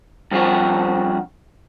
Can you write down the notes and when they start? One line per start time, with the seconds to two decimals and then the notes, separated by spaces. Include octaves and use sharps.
0.31 G2 F3 C4 F#4